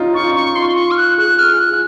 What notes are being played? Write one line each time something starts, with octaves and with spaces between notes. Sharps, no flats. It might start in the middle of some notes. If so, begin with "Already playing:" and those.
Already playing: C#4 D#4 F4
F4 C#6
D#4
C#6
F4 C6
C#6
F6
F#6
G#4 F#6
F6
G#4
F#6
F4